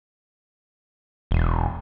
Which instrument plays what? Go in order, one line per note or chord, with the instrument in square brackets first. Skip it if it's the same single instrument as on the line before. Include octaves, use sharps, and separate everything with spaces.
[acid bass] E1